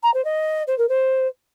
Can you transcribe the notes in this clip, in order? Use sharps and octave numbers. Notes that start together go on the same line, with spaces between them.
A#5
C5
D#5
C5
A#4
C5